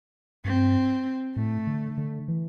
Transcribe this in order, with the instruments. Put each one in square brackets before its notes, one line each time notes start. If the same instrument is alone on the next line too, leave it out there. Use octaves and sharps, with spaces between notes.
[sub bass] G2 [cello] C4
[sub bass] A2 [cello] A3
[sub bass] D3
D3
E3